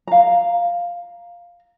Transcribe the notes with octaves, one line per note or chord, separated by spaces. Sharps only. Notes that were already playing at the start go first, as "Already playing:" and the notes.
F5 A#5